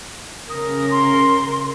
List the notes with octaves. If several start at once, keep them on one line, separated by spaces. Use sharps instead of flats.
C#3 A#4 D#6
C6